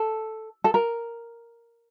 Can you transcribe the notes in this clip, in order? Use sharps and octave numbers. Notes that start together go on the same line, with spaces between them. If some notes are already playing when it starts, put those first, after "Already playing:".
Already playing: A4
A4
A#4